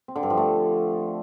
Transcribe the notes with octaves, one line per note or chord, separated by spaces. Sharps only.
C4
D3
G2
F3
A3